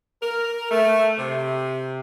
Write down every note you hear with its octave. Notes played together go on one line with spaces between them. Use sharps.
A#4
A3
C3